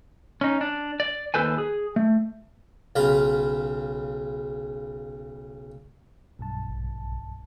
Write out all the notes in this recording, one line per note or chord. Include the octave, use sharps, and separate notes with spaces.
C#4 D#4
D4
D5
D#2 E3 A4 B4 C5 G#5
G#4
A3
B1 C#3 F4 A#5 B5
B1 G2 A5
A#1